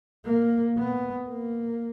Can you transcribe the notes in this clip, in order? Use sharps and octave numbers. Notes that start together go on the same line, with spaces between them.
A#3
B3
A#3